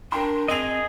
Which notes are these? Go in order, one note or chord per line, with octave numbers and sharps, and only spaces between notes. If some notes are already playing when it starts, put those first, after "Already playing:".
D4 A#4 G5 C6
C4 G#4 D#5 D#7 F7